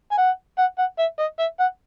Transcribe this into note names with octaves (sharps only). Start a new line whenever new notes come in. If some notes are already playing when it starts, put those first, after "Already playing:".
G#5
F#5
F#5
F#5
E5
D#5
E5
F#5